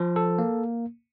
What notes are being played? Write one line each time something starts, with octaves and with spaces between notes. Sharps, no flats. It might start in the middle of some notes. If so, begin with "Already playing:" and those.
Already playing: F3
A4
A#3